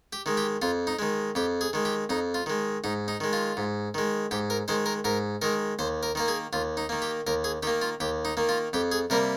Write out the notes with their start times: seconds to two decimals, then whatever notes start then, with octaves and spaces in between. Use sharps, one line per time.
0.13 G4
0.26 D#3 G#3
0.37 G4
0.62 F2 F4
0.87 D#4
0.99 D#3 G#3
1.35 F2 G4
1.61 G#4
1.73 D#3 G#3
1.85 G4
2.09 F2 D#4
2.34 F4
2.46 D#3 G#3
2.84 G#2 D#4
3.08 D#4
3.20 D#3 G#3
3.33 F4
3.57 G#2
3.94 D#3 G#3
4.31 G#2 G4
4.50 A#4
4.68 D#3 G#3 C5
4.86 A#4
5.04 G#2 A#4
5.42 D#3 G#3 A#4
5.79 D#2 C5
6.03 A#4
6.15 D#3 A#3 A#4
6.28 G#4
6.53 D#2 F4
6.77 D#4
6.89 D#3 A#3
7.02 G4
7.27 D#2 A#4
7.44 G#4
7.63 D#3 A#3 G4
7.82 F4
8.00 D#2 G4
8.25 D#4
8.37 D#3 A#3
8.49 F4
8.73 F2 G4
8.92 G#4
9.10 C3 G3 A#3 A#4